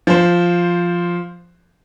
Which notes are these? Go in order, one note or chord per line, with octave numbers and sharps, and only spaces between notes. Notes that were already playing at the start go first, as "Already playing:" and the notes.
F3 C5